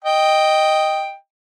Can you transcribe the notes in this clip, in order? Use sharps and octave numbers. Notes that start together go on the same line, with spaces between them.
D#5 G5